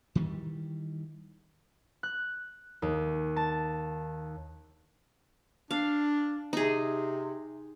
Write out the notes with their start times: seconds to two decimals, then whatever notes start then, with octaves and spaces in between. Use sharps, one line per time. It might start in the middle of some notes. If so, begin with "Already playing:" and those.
0.15 D#3 E3 G3
2.03 F#6
2.82 D#2
3.36 A5
5.71 D4 F5
6.53 C3 D#4 G#4